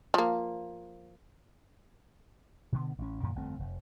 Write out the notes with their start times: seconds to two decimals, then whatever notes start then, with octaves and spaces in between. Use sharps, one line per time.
0.14 F3 A#3
2.72 B2 D3 B3
2.99 A1 C#4
3.23 F#2 A#2 D#3
3.36 G1 F2 A3 C4
3.59 F1